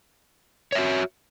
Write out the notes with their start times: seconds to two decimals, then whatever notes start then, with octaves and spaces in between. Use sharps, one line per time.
0.72 C#5
0.75 E5
0.78 F#4